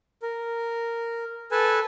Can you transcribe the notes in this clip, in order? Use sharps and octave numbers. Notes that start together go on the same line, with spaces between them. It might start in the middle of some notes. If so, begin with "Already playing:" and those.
A#4
A4 B4 G#5 A5